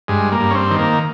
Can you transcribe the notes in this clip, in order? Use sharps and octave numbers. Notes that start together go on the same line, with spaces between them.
G2 G#3
A#3
G2
C#4
C4
D#3
A#3